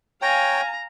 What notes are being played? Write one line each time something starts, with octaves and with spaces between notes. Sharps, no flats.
C#5 F5 G5 G#5 A#5